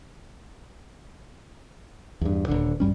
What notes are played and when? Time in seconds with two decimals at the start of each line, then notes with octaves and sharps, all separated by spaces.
2.21 E2 G2
2.48 D#1 A#1 D3
2.80 A1 F#2 G3 C#4